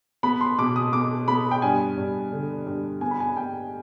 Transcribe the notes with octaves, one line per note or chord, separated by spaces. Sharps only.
B3 B5
C6
B2 D6
D#6
B3 D6
B3 B5
G5
G2 G#5
G2
D3
G2
B3 G#5
B5
G#5
B3 G5